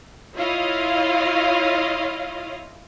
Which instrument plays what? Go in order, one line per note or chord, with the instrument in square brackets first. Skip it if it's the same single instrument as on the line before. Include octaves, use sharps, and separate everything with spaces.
[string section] E4 F4 C#5 D#5 F5